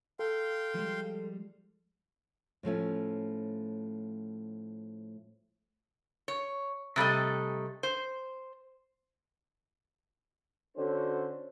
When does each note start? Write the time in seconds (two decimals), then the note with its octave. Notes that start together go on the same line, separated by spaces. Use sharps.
0.19 A4 F5 G5 C6
0.75 F3 G3 G#3
2.63 A2 F3 A3 C#4
6.28 C#5
6.96 C3 G3 A3 D#5
7.83 C5
10.76 D3 C#4 D4 F#4 A4 C5